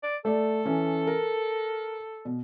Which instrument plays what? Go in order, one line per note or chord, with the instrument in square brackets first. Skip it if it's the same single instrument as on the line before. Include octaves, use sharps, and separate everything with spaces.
[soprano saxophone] D5
[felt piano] A3 D5 [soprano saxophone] A4
[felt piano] E3 C#4
A#4
B2